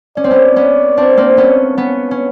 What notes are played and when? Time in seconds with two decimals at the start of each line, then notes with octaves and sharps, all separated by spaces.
0.17 C#4 D5
0.24 C4
0.31 B3 C#4
0.56 B3 C#4
0.97 C4 D4
1.17 A#3 C4
1.37 B3 C#4
1.78 B3 C#4
2.11 C#4